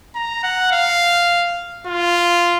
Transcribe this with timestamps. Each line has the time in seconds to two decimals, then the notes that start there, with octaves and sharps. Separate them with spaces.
0.15 A#5
0.43 F#5
0.72 F5
1.87 F4